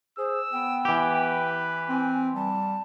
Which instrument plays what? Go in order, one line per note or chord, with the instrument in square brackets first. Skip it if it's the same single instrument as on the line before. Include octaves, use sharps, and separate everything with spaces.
[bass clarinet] G#4 [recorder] C5 [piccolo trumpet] E6
[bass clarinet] B3 [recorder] G5
[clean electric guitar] E3 G4 [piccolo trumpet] B4
[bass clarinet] C4 [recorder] G#5
[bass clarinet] G3 [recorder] A5